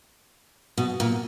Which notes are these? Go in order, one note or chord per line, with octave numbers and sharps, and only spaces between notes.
B2
A#2